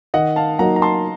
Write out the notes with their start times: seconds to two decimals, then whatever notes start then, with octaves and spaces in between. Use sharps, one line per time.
0.14 D#3 D#5 F#5
0.36 F5 A5
0.59 F#3 A#3 D#4 F#4 F#5 A#5
0.76 A#5
0.82 A5 C6